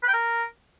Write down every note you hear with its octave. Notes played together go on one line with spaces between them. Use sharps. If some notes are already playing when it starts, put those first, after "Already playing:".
B4
G5
A#4